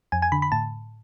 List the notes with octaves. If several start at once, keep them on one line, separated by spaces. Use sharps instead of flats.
F2 G#5
G#5
D3 B5
B5
A2 A5